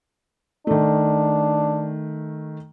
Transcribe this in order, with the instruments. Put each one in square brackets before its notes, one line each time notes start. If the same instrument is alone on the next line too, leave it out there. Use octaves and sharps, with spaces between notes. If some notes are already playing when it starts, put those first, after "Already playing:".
[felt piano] D#3 A3 [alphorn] D4